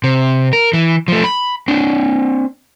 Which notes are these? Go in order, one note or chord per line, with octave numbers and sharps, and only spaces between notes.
C3
A#4
E3
F3 A3
B5
C4 D4